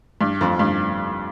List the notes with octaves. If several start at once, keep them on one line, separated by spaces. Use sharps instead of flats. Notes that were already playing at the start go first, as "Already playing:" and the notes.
G2
F2
G2